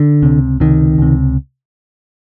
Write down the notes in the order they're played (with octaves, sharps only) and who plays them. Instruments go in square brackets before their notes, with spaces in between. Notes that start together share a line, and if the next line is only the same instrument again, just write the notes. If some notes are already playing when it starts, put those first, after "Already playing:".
Already playing: [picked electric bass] D3
C#2 C3
C#2 C3 D#3
C#2 C3